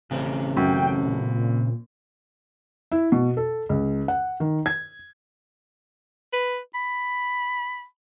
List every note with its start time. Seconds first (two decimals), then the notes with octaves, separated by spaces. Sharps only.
0.11 A1 C#3 C4
0.57 F#2 G5
1.04 A#2
2.92 E4
3.12 B2
3.37 A4
3.69 C#2
4.08 F#5
4.40 D#3
4.66 G#6
6.33 B4
6.75 B5